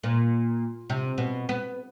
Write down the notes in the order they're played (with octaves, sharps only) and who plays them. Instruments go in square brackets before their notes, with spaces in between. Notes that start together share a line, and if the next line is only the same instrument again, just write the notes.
[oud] A#2
C3
B2
B3